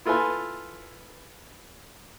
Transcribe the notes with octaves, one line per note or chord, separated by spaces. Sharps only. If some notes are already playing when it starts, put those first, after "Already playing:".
E4 F4 A4 B4 G#5